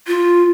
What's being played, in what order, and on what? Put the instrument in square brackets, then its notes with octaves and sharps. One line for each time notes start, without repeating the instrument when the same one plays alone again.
[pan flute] F4